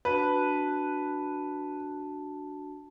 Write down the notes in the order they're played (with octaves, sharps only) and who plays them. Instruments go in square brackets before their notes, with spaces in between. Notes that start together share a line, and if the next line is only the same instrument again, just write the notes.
[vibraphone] D4 F#4 A5 [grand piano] B4